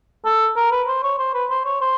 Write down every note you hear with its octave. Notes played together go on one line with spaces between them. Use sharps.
A4
A#4
B4
C5
C#5
C5
B4
C5
C#5
C5